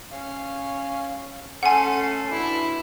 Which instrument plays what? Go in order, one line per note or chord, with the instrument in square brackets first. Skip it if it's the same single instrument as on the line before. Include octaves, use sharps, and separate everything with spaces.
[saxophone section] C#4 F5
[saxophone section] A3 C#4 [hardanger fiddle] A4 C6 [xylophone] F#5 G#5
[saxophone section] B2 D4 [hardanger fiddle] E4